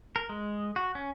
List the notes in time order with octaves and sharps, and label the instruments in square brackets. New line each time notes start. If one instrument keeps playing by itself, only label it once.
[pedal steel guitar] A#4
G#3
F#4
C#4